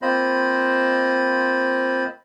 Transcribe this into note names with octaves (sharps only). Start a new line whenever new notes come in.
A#3 C4 F4 C5 D#5 B5